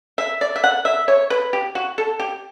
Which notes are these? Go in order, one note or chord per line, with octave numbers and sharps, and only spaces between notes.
E5
D5
E5
F#5
E5
C#5
B4
G4
F#4
A4
G4